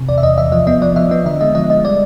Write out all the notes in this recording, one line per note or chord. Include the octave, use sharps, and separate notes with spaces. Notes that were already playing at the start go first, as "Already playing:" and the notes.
Already playing: C3
E2 D5
E5
E2 D#5
E2 E5
F3 D#5
B3 D#5
F3 D5
F3 E5
B3 D#5
D3 E5
G#3 D#5
F3 D#5
G#3 D#5
G3 D5